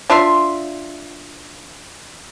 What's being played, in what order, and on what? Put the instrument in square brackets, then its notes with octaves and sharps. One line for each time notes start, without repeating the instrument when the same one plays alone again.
[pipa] D4 F4 E5 C6